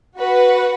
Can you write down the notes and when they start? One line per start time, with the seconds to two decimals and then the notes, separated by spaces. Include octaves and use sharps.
0.18 F#4 B4 F#5